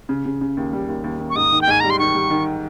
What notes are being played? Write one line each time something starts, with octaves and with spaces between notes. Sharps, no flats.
C#3
C#3
C#3
D#2
G3
D#2
D#2
D#2
C#6
G#2 D#6
D#3
G5
G#2 G#5
G3 A#5
C6
D#3 C#6
G3
D#3